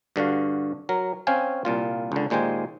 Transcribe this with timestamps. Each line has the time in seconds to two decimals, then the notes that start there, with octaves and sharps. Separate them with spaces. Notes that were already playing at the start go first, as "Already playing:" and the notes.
0.16 G2 D3 F#4 F5
0.89 F#3 A#4
1.27 C4 C#4 F5 G5 G#5
1.65 C2 A#2 F4
2.12 C#2 D3
2.30 D#2 A#2 G#3 C5 G5 G#5